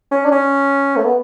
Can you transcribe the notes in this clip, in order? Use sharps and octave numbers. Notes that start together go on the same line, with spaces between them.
C#4
D4
C#4
A3
B3